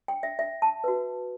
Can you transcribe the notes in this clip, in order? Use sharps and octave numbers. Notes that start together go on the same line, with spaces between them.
G5
E5
E5
A5
F#4 B4